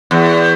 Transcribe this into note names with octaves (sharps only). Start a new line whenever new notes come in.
E2